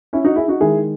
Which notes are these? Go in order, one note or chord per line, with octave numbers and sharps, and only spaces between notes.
C#4 E4
D#4 F#4
E4 G#4
D#4 F#4
D#3 G#3 E4 G#4